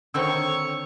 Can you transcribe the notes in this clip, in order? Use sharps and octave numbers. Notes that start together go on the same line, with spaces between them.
D3 D#3 C4 C#5 C#6 E6